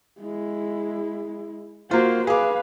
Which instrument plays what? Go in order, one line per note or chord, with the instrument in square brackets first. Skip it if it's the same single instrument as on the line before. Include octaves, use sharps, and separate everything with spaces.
[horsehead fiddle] G#3 E4
[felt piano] A#3 F4 [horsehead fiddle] F#4 C5
[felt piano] G#4 D6 [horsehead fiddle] B4 F5